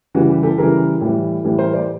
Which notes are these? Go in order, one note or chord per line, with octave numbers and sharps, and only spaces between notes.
C#3 E3 G3 F#4
G4
G4 A4
C#3 E3 G3 G#4 A#4
A2 E3 G3
A2 E3 G3
A#4 C5
C5 D5